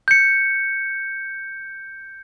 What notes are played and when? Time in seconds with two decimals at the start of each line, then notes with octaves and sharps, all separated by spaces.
0.08 G6 C#7